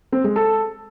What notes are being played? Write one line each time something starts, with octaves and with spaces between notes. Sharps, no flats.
C4
G#3
A4